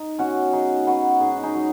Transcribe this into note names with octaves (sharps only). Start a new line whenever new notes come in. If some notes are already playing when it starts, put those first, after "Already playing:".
Already playing: D#4
B2 C#4 F#4
F#3 D#4 G#4
F#3 F#4 B4
G#2 D#4 G#4
D#4 G#4
F#3